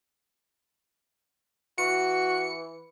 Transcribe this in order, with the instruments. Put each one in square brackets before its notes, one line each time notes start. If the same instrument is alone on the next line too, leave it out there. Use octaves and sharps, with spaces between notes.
[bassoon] E3 [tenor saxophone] F#4 [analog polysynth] C#7